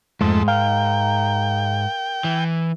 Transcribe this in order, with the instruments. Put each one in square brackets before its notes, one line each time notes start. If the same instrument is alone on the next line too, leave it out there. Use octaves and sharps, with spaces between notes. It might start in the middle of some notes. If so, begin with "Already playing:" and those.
[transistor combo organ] F2 A3 [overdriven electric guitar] G#2 [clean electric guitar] G#3
[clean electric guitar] A#4 F5 [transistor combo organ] G5
[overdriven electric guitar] E3